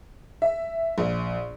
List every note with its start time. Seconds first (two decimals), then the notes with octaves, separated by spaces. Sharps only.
0.42 E5
0.98 A#1